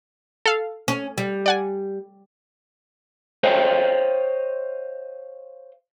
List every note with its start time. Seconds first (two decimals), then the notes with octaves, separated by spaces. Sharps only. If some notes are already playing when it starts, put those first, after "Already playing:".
0.46 A4 F5
0.88 C#4
1.18 G3
1.46 D5 F#5 G#5
3.43 C5 C#5 D#5 F5 G5